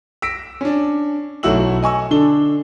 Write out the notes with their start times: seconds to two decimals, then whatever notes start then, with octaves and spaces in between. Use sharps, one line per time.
0.22 E6 A#6 B6 D7
0.61 C#4 D4
1.43 B1 A3 E4 F#4 E6 F#7
1.82 D#5 G#5 C#6 E6
2.11 D3 D4 A4 G7